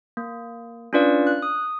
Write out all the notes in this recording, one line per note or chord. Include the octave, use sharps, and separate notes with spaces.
A#3
C#4 D4 F4 B4 D5 F5
F#6
D#6